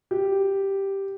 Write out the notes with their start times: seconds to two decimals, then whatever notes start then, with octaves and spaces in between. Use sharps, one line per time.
0.11 G4